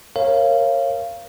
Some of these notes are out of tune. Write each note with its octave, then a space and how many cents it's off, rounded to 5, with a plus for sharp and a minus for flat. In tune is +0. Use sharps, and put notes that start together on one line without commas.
A#4 +0 C#5 -20 F5 -25